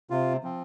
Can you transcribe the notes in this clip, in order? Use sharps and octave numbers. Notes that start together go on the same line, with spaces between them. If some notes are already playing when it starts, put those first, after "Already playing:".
C3 F4
F3 C4